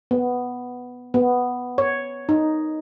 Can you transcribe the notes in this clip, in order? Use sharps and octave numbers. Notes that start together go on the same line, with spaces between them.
B3
B3
C#5
D#4